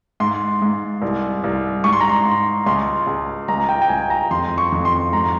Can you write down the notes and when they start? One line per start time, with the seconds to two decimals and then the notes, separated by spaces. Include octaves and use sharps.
0.20 G#2 C6
0.62 G#2
1.02 C2
1.44 C2
1.84 G#2 C#6
1.93 C6
2.01 A#5
2.09 C6
2.25 G#2
2.66 C#2 C6
3.07 C#2
3.48 C#2 A#5
3.69 G5
3.82 G5
3.89 C#2 G#5
4.10 A#5
4.30 F2 C6
4.58 C#6
4.72 F2
4.85 C6
5.13 G#2 A#5